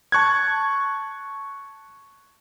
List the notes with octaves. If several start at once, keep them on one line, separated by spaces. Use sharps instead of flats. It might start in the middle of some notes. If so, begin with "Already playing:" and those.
A5 C#6 F#6 G#6